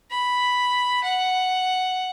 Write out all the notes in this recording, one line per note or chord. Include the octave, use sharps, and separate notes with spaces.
B5
F#5